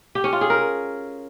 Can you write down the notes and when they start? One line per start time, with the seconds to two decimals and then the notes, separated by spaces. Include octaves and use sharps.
0.15 G4
0.24 C#4
0.33 F4
0.41 G#4
0.50 A#4